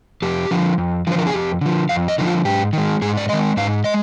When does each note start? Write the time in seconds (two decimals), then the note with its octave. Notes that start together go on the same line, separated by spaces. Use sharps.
0.22 F2 G4
0.51 D3 F3
0.78 F2
1.07 D3 F3 C5
1.19 A#4
1.27 G#4
1.33 F2 G4
1.61 D3 F3
1.89 F2 F5
2.08 D#5
2.18 D3 F3 D#4
2.27 F4
2.45 G#2 G4
2.73 D#3 G#3
3.02 G#2 G#4
3.17 D5
3.29 D#3 G#3 D#5
3.57 G#2 F5
3.84 G#3 D#5